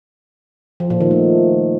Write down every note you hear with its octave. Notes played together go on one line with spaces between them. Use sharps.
F3
A#2
D#3
A3